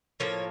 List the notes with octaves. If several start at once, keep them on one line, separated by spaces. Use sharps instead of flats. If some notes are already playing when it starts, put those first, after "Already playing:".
A2 F3 A#3 C#5